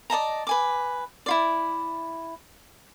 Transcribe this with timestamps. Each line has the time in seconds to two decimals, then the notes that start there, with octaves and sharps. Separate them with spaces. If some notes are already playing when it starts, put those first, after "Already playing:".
0.10 D5 D#5 A5 A#5
0.47 B4 G#5 D6
1.26 E4 F4 D5